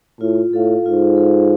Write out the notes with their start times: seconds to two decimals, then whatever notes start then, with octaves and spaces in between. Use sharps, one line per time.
0.21 A2 F4
0.53 A2 A4 F5
0.85 G#2 F4
1.17 A4 F5